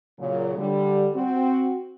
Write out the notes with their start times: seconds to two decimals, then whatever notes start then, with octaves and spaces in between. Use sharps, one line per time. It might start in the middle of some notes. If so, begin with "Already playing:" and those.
0.18 A#2 C#3 F#3
0.56 D3 G3
1.14 C4 F#4